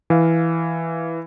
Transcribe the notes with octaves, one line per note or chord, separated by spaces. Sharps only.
E3 F5